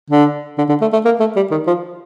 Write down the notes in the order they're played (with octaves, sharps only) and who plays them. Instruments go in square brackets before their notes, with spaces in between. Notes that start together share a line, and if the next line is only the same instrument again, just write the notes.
[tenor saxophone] D3
D3
D3
A3
A3
A#3
A3
G3
D#3
F3